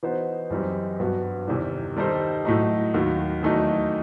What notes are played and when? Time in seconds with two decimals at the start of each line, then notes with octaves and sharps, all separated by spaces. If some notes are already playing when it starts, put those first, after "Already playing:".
0.03 E3 B3 D#4 F#4 C5
0.50 F#2 E3 G3 C4 D#4
0.99 G2 F#3 B3 F#4
1.48 E2 C3 D#3 G3
1.97 D#3 G3 D#4 A4 C5
2.45 A2 F#3 A3 D#4
2.94 D#2 D#3 F#3
3.43 E2 D#3 F#3 A3 D#4